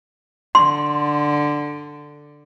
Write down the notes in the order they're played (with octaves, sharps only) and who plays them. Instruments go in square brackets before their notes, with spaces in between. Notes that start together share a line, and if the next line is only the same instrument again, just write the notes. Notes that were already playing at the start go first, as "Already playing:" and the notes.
[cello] D3 [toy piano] C6